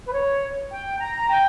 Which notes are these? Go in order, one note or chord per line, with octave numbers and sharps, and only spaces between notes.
B4
C#5
G5
A#5
G5